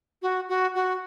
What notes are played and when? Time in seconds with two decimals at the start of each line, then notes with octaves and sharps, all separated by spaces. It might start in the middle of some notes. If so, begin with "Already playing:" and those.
0.22 F#4
0.49 F#4
0.75 F#4